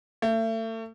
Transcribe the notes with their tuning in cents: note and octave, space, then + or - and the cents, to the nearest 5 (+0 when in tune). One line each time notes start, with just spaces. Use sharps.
A3 +35